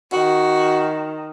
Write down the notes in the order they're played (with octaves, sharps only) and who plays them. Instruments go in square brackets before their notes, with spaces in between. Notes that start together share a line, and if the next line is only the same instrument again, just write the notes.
[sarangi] D#3 [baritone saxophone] F#4